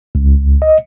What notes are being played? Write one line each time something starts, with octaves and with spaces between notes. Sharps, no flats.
C#2
D#5